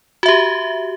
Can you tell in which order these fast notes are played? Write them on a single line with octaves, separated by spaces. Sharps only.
F#4 E5 G4